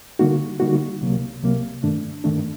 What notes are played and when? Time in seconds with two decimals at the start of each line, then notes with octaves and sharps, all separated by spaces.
0.19 D3 G3 A#3 D#4 F#4
0.60 D3 G3 A#3 D#4 F#4
1.01 C2 C3 F#3 A#3
1.42 C2 C3 F#3 A#3
1.83 G2 D#3 A3 D4
2.24 G2 D#3 A3 D4